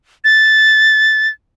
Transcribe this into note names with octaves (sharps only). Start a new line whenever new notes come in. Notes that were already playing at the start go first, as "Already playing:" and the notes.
A6